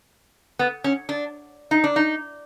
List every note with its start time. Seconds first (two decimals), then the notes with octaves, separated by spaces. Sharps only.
0.59 B3
0.84 C#4
1.09 D4
1.71 D#4
1.84 D4
1.96 D#4